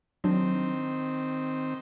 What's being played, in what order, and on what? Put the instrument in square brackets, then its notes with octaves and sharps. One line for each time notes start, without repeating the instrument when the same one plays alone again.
[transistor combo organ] D#3 C4 [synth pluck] F#3 D4